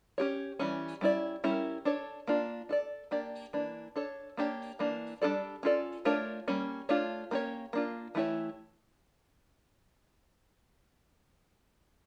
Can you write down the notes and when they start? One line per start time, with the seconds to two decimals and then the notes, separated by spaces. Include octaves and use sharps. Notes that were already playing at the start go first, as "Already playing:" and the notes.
0.18 C#4 G4 C#5
0.59 E3 G3 C#4
1.01 G3 C#4 E4 A#4 D5
1.44 G3 C#4 E4 G4 A#4
1.85 D4 A4 C#5
2.28 A#3 D4 F4
2.69 D4 A4 D5
3.11 A#3 D4 G4 D5
3.53 E3 A#3 D4
3.96 D4 A4 C#5
4.37 A#3 D4 G4 C#5
4.79 E3 A#3 D4
5.22 G3 D4 F4 A4 D5
5.63 C#4 F4 A4 D5
6.05 A3 D4 F4 A#4 C#5
6.48 G3 A#3 C#4
6.89 A3 D4 F4 C#5
7.31 A#3 C#4 G4 C#5
7.73 A#3 D4 F4
8.15 E3 A3 E4 G4 C#5